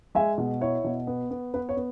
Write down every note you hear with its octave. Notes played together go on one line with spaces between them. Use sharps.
G#3 E5 G#5
B2
E4 C#5
B2
B3
B3
B3 B4
C#5
B3